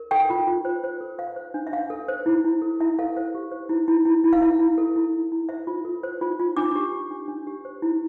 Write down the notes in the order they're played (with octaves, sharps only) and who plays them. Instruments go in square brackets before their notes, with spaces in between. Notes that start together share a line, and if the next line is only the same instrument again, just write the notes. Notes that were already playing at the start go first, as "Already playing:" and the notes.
Already playing: [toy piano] A#4
A4 G5
F4
F4
C5
C5
A4
C5 F5
C5
D4
E5
D4 F5
A4
C5
E4
E4
A4
E4 E5
A4 F5
C5 F5
G4
C5
E4
E4
E4
E4
F5
E4 E5
E4
A4
E4
E4
E4
C5 E5
F4
A4
C5
F4
F4
D4 D6
G4
G4
D4
D4
G4
C5
E4